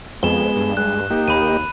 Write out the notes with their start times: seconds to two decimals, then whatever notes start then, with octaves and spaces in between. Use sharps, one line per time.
0.23 F2 G#3 B3 E7 G7
0.56 G2
0.77 G2 G#3 F#6
1.10 A#3 D#4 G4
1.28 D#2 B5 D#7